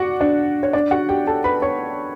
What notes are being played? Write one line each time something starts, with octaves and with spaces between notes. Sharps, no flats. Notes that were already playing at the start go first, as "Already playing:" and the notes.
Already playing: F#4 D5 F#5 D6
D4 D5
C#5
D4 D5
F#4 F#5
G4 G5
A4 A5
B4 B5
C#5 C#6